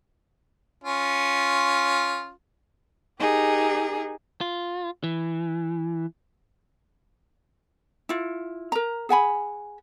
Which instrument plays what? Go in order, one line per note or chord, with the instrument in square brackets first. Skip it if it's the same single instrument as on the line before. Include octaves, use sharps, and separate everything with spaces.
[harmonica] C#4 F4
[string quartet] D#4 G4 G#4 A#4
[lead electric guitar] F4
E3
[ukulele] E4 F4
A#4 A#5
G#4 F#5 G#5 B5